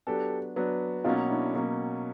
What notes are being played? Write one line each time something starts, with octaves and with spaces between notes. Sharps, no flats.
F#3 B3 D4 G4 A4
F#3 B3 D4
B2 F#3 A#3 C#4 D#4 F4
D4 E4
B2 F#3 A#3 C#4